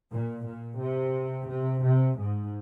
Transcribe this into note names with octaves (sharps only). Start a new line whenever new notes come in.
A#2
A#2
C3
C3
C3
G#2